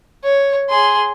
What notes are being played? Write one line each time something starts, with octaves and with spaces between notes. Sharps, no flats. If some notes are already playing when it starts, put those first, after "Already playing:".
C#5
G#4 C6